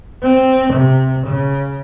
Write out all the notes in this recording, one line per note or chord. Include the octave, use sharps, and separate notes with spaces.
C4
C3
C#3